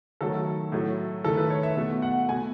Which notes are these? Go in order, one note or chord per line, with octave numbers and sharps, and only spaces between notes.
D#3 F#3 A3 A4
A2 F#3 A3
D#3 A3 A4
B4
C#5
E5
B2 A3
F#5
B2 A3 G#5